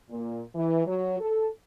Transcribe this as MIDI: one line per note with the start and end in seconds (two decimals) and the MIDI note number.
0.11 0.42 46
0.54 0.86 52
0.86 1.20 54
1.20 1.47 69